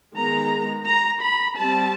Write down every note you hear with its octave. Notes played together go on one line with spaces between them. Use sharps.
D#3 G#3 B3 A#5
A#5
B5
G3 C4 A5